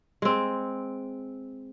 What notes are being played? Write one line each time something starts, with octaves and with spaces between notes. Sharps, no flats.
G#3 C4